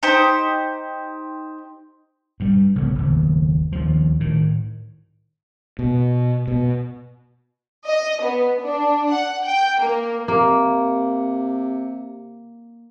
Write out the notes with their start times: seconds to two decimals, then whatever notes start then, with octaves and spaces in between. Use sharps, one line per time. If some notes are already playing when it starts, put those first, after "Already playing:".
0.03 D#4 G4 C5
2.40 G2 G3
2.76 A1 C3 E3 B3
2.95 F#1 D#2
3.72 D#2 F3
4.20 A2 D#3
5.79 B2
6.48 B2
7.85 D#5
8.22 B3
8.61 D4
9.12 F#5
9.45 G5
9.81 A#3
10.28 C3 A#3